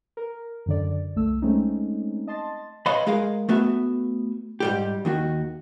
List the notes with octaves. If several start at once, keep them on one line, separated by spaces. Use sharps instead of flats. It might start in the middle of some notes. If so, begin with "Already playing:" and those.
A#4
F#2 D3 D5
C2 A3 E6
G#3 A3 C4 C#4 D#4
D#5 A5 C6 A6
B4 C#5 D#5 F5 B5 C6
G#3 G#4 A#4 F5
A3 B3 F#4 E5
G#2 G3 G4
D#2 D#3 F#4